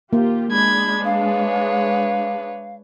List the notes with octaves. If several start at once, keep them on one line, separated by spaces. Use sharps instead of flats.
A#3 F4 G4
G#3 D4 B5 G#6
B4 C#5 F5